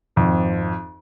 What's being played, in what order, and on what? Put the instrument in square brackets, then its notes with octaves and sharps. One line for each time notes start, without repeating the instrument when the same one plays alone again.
[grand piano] G#1 F2